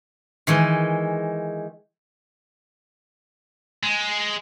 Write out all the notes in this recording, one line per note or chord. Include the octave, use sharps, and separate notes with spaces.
D#3 E3 G#3
G#3